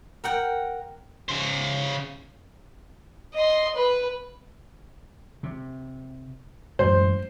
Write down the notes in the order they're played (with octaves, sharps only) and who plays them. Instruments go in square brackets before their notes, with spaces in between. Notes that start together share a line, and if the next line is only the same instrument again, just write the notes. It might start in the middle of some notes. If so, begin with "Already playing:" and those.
[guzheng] A#4 F#5 G5
[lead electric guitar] C#3 C5
[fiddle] D#5 C6
B4
[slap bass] C3
[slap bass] A1 F#2 G#3 [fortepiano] C5